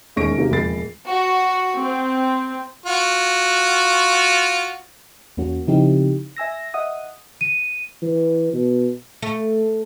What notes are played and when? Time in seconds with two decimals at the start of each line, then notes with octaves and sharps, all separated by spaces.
0.16 E1 D#2 C#4 C#6 A#6 D7
0.37 C3 F#3 A#3
0.50 E1 F2 A#2 B5 A6 C7
1.06 F#4
1.79 C4
2.86 F4 F#4
5.37 E2 A#3 C#4 F#4
5.67 C#3 F3 C4 D#4 E4 G4
6.36 E5 G#5 E6 A#6
6.74 D#5 E5 F#5 D#6
7.41 D#7
8.02 E3
8.53 B2
9.22 A3